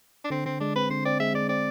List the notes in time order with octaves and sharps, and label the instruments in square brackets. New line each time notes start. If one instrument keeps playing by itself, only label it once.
[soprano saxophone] D4
[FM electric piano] D3 [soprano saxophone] C4
[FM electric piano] D3 [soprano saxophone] C4
[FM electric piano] G#3 [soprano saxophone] D4
[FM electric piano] C4 [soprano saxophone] B4
[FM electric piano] D3 [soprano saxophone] C5
[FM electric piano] C4 [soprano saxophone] D5
[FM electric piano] G#3 [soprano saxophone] E5
[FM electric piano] G#3 [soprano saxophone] D5
[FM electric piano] C4 [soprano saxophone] D5